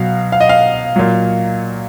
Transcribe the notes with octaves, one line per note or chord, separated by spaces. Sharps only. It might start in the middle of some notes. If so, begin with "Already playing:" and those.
Already playing: B2 F#3 F5
F5
D#5
F5
A#2 F#3